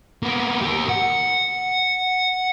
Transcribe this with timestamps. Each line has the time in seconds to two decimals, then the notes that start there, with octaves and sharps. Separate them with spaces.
0.23 A#3 B3
0.62 G4 A#4
0.89 F#5